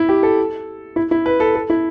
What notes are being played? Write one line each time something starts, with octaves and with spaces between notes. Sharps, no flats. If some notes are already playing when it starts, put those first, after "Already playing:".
Already playing: E4
G4
A4
E4
E4
B4
A4
A4
E4